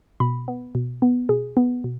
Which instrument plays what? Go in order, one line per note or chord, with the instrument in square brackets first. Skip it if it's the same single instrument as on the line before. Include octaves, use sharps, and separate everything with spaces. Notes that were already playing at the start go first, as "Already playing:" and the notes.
[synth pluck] B2 B5
B3
B2
B3
B2 G#4
B3
B2